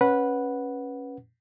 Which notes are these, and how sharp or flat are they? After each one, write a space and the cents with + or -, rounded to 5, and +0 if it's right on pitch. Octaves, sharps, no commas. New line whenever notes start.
C#4 -10 B4 -10 F#5 +0